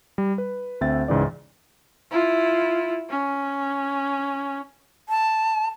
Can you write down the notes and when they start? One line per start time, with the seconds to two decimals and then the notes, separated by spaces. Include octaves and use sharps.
0.18 G3
0.38 B4
0.81 D2 C4 C5 E5 A6
1.08 C#2 G#2 C#3 E3 D5
2.11 E4 F4
3.10 C#4
5.09 A5